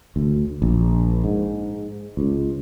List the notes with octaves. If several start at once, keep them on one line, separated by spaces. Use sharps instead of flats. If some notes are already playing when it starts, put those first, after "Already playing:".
D2
A#1
G#2
C#2